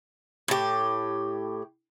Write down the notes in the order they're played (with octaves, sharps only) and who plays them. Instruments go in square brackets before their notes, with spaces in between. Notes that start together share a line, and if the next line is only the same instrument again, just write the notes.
[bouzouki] A2 G4